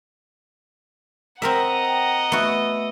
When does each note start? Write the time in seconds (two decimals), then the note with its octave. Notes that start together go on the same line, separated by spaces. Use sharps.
1.42 C4 A#4 D#5 E5 F#5 A#5
1.85 G5
2.32 A3 B3 F#4 E5 E6